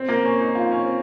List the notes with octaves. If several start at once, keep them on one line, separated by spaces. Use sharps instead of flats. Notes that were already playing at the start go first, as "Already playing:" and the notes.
Already playing: C4
A#3
C#4
D#4
F4
C#4
C4